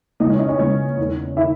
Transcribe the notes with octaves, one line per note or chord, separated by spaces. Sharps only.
C#2 C#3 E3 D#4 D#5
C#4 C#5
D#4 D#5
C#4 C#5
C#2 C#3 E3 C#4 C#5
E2 D#3
D#3 E4 E5